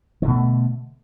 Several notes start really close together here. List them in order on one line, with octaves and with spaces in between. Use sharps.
D#3 D3 B2 A3